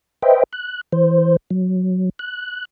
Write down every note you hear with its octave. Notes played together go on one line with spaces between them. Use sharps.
B4 C5 D#5 E5 G5
F#6
E3 C5
F#3
F#6